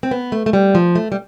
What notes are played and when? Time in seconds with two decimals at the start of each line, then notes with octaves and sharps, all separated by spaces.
0.03 C4
0.11 B3
0.32 A3
0.46 A3
0.53 G3
0.75 F3
0.95 A3
1.12 G3